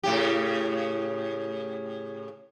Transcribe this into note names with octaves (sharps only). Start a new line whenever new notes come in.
A2 C#3 G4